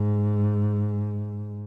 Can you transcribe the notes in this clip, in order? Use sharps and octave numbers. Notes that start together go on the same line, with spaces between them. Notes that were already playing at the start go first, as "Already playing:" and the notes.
Already playing: G#2